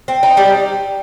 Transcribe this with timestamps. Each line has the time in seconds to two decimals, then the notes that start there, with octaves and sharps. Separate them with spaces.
0.08 C4
0.23 D#4
0.37 G3